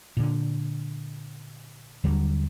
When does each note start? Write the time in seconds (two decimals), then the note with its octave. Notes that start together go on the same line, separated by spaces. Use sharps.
0.17 A#2 D3
2.04 D#2 D3 F#3 G3